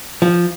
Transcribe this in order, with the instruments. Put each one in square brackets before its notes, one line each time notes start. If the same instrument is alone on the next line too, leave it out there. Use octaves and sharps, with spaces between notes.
[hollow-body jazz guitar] F3